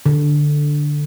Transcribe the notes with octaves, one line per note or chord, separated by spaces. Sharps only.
D3